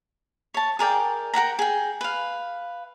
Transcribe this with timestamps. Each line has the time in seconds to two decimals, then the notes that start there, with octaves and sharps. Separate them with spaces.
0.54 C#5 A5
0.79 G#4 A#4 D5 G5
1.34 A#4 F#5 G5 A#5
1.59 G#4 G5
2.01 B4 F5